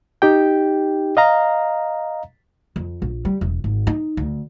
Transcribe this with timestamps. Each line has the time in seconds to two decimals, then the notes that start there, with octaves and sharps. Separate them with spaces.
0.22 D#4 G4 G5
1.17 D#5 F5 A#5
2.76 F2
3.02 A#1
3.25 G3
3.41 E1
3.64 G#1
3.87 D#4
4.17 D2